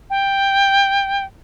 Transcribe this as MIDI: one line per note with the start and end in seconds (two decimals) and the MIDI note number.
0.10 1.25 79